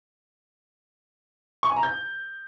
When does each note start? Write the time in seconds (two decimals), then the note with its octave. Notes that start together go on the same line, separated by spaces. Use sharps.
1.63 C#6
1.70 G#5
1.76 A#5
1.83 G6